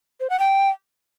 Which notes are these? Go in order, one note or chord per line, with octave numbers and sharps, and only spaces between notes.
C5
F#5
G5